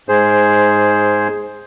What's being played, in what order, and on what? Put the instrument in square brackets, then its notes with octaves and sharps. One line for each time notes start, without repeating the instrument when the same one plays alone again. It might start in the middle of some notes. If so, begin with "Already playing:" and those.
[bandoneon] G#2 G#4 C5